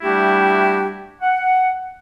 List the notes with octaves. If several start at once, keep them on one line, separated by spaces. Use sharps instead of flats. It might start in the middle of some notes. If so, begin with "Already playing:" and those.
G3 A3 D4 E4 F#4 G4
F#5